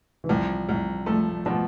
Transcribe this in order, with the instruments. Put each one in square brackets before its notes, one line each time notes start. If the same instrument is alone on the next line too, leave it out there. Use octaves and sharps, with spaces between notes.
[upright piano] E3
[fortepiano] C2 [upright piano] F3
[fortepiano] C2
[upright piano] F3 [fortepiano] A3
[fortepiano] B2 [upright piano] F3